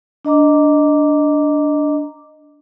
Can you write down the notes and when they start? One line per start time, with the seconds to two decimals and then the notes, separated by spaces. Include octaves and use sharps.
0.25 D4 D#5 A#5 D6